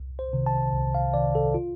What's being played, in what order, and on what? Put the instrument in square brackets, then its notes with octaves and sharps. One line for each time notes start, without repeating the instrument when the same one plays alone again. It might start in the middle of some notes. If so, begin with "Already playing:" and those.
Already playing: [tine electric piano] C2
C5
C3 D#3
A5
C2
F5
C3 D#3 D5
A4
F4